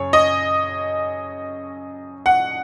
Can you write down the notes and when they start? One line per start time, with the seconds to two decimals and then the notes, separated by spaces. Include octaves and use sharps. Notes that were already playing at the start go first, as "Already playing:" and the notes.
Already playing: F#2 C#3 C#5
0.13 D#5
2.26 F#5